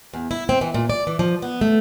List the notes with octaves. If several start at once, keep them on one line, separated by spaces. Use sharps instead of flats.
E2
E4
C4
E3
A#2
D5
E3
F3
B3
A3